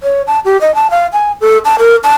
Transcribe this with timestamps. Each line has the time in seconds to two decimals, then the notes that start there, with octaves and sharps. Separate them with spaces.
0.03 C#5
0.27 A5
0.45 G4
0.61 D#5
0.75 A5
0.90 F5
1.13 G#5
1.41 A4
1.65 A5
1.79 A#4
2.04 A5